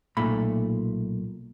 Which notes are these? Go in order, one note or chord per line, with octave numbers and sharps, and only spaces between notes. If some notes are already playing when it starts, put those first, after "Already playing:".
B1 A#2 A3 B5